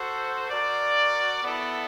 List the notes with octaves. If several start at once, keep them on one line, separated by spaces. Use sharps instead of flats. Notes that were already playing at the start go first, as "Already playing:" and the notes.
Already playing: F#4 A4 C5
F#4 A#4 D5
B3 E4 A4